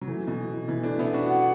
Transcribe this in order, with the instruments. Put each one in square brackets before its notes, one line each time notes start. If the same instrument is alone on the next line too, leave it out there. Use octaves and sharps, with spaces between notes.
[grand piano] F#3
E3 A3
B2 E3
B2 E3
A3 D4
B3 E4
D4 F#4
[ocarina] F#5